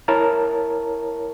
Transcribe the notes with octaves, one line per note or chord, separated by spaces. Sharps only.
E4 A#4 C#5 A5 A#5